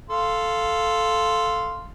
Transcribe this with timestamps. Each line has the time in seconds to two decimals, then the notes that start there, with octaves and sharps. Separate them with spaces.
0.10 A4 F5 C6